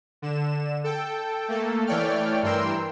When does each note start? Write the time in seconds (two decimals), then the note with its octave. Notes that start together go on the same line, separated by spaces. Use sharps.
0.22 D3 E7
0.84 A4 G5
1.48 A3 A#3 A4
1.87 E3 A3 C#5 D5 G5 F6
2.43 G2 E3 A#4 G5 C6 E6